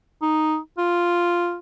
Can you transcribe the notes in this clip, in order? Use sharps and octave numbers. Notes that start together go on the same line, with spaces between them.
D#4
F4